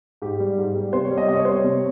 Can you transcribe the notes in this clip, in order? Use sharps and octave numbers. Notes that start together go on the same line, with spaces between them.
G#2 G4
G3
G#2
G3
C3 C5
C#5
G3
D#5
C3 D#5
C#5
G3 C5
C#5
C3